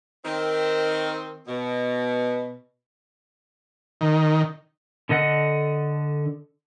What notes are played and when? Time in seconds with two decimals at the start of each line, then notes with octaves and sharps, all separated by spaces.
0.25 D#3 C4
1.47 B2
4.01 D#3
5.09 D3 A4 D#5 F#5